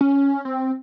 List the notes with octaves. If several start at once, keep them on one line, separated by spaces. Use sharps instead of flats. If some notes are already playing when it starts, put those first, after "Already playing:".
C#4
C4